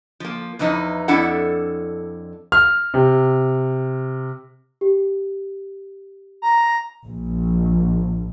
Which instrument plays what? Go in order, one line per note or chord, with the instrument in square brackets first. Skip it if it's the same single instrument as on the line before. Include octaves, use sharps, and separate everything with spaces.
[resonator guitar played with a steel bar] F3 A#3
E2 E3 F3 D#4
F2 D4 E4 A4 F#5
[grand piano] F6
C3
[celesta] G4
[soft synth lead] A#5
[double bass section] A#1